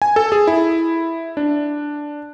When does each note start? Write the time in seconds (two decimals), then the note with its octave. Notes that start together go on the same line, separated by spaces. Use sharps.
0.02 G#5
0.16 A4
0.32 G#4
0.47 E4
1.37 D4